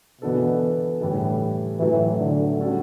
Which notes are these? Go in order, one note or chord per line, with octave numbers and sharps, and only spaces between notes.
B2 E3 B3 D4 A4
A2 E3 G3 D4 A4
A2 E3 F#3 A3
D3
D3 G3 C#4 F#4 A4